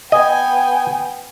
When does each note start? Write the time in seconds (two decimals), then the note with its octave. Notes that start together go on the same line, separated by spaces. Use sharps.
0.12 B3 D#5 G5 G#5